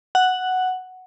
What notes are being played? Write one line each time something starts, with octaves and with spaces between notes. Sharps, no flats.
F#5